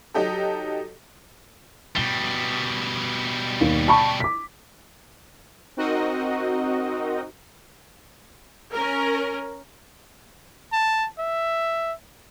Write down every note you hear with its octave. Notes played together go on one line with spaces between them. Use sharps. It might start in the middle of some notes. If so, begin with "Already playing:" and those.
F#3 D#4 G4 A4
B2 G3 G7
D#2
A5 B5 C#6
D6 B6
C4 D#4 F#4 A#4 D#5
C#4 A#4
A5
E5